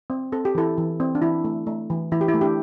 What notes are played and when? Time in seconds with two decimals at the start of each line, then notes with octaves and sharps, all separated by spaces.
0.10 C4
0.32 C4 A4
0.45 G4
0.55 E3 E4 A4
0.78 E3
1.00 C4
1.15 D4
1.22 E3 E4
1.45 A3
1.67 A3
1.90 E3
2.12 E3 E4
2.21 G4
2.28 E4
2.34 A3
2.41 D4 G4